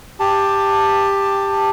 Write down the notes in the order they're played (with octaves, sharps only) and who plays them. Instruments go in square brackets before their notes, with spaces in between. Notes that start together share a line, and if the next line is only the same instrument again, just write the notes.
[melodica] G4 A5